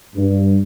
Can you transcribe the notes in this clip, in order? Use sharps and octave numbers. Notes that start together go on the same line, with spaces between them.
G2